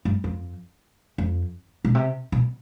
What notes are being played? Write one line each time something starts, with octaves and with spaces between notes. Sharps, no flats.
G2
F2
F2
B2
C3
B2